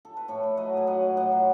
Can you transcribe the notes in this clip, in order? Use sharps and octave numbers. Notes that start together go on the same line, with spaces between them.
A4
B4
A2 A4 C#5
A2
F#3 B4 D#5
A2 G#5
F#3 D#5 F#5
A2
A2 D#5 F#5
F#3